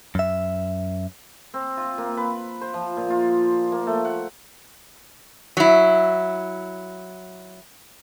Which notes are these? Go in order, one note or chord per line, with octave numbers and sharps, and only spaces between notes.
F#2 E5
C4
F4
A#3
B4
C5
F3
A#2
F4
A#3
A3
F#5
F#3 E4